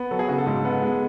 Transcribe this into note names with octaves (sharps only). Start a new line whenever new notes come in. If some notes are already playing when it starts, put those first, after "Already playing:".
Already playing: B3
F#3 A4
G#4
C#3 F#4
A4
G#2
B3
G#3